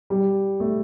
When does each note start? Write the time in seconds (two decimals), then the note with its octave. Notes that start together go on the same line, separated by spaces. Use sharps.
0.10 G3
0.60 A3